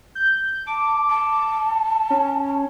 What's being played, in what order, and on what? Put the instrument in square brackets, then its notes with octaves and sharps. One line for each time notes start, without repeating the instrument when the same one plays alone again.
[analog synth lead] G6
[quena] A5 [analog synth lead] D6
[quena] A5
[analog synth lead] C#4